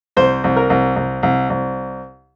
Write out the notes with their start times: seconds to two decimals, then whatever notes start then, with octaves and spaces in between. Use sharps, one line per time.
0.17 C2 C5
0.44 C2
0.56 A#4
0.70 C2
0.96 C2
1.23 C2
1.50 C2